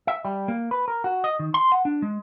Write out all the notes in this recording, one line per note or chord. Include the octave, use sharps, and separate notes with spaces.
E5
G3
A#3
B4
A#4
F#4
D#5
D#3
C6
F#5
D4
G#3